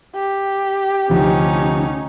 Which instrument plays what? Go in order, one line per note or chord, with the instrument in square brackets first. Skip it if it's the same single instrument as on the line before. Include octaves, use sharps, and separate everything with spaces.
[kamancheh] G4
[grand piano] D2 C3 F3 [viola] C#4 D#4